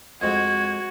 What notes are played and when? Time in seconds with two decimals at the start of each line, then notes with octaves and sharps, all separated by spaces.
0.21 F2 G#3 F#4 G#6